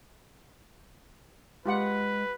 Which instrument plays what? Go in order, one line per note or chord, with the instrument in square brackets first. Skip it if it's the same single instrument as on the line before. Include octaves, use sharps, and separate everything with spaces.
[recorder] G#3 [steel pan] F4 G4 F#5 [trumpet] B4